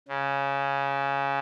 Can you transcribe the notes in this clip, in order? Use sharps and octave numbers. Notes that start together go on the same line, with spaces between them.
C#3